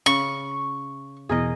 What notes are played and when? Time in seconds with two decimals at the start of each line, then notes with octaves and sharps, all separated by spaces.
0.06 C#3 C#6
1.29 E2 B2 E3 G#4 A#4 D#5